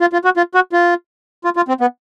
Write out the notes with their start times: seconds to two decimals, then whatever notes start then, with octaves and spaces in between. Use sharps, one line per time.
0.01 F4
0.13 F4
0.25 F#4
0.37 F4
0.55 F#4
0.73 F4
1.45 F4
1.56 F4
1.68 C4
1.81 B3